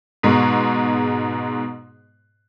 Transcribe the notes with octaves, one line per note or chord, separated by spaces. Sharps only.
G#2 B2 G#3